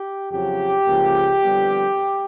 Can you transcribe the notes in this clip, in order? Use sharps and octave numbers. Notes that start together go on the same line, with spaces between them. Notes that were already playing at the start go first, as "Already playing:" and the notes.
Already playing: G4
F2 C#3 F#3 G4
C#2 C#3 F3 A#3
F2 D3 G3 B3